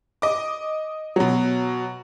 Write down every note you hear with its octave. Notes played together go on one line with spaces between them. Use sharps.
D#5 D6
B2 F#3